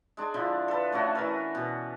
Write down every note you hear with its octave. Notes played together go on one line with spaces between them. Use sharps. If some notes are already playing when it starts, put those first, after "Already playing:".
G#3 D4
D3 F3 E4
A4 B4
A3 C#4 D4 F#4
E3 A#4 B4
B2